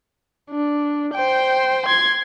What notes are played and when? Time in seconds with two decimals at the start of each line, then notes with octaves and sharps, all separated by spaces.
0.51 D4
1.14 C5 G5
1.86 C6 G#6